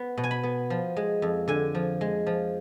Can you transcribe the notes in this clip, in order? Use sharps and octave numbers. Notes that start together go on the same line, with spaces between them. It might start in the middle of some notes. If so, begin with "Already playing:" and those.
Already playing: B3
B2
G#5
B5
B3
F3
G#3
F2
D3 G#5
F3
G#3
F3